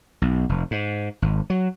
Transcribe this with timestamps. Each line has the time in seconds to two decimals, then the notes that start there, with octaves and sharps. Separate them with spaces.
0.22 B1
0.49 F1
0.71 G#2
1.22 G#1
1.50 F#3